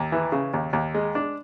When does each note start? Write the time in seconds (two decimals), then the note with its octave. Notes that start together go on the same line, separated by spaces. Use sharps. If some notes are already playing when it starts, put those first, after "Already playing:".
Already playing: D#2
0.12 E3
0.32 C#3
0.54 D#2
0.73 D#2
0.94 G#3
1.15 D4